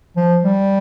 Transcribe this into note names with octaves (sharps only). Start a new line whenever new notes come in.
F3
G3